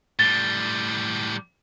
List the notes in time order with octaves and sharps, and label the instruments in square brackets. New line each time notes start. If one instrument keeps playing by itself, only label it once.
[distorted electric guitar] A2 G3 [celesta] A6 G7